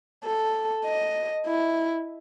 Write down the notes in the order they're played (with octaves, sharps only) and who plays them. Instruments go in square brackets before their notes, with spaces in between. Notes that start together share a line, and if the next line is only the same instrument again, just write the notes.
[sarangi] A4
D#5
E4